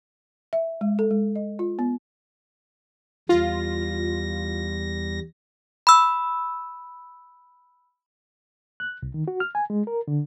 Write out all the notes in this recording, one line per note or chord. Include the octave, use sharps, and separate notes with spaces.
E5
G#3
A4
G#3
D#5
F4
B3
E2 G3 F4 A#6
B5 E6
F#6
C2
D#3
F#4
F6
G#5
G#3
A#4
D3